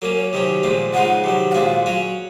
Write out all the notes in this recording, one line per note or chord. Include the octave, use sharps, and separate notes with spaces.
F#3 A#3 C#4 A#4
C#5
C3 D#3 F#3 C#4
A#2 F3 G#3 C4
C#3 F3 G#3 D#4 F#5
C3 D#3 F#3
F#5
A#2 G#3 C4 F#4 F5
F#3 C#4 F#4